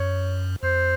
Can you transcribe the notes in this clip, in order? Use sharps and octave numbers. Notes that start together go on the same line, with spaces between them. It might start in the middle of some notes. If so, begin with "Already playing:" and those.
Already playing: F#2 C#5
F2 C5